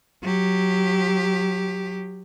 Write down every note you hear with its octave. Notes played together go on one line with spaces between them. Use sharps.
F#3 G4